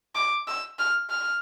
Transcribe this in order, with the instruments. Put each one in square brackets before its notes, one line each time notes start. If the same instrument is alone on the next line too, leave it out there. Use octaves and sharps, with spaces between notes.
[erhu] D6
E6
F6
F6